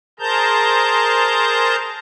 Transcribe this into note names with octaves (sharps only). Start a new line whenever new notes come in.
G#4 A#4 C5 A5 A#5 G6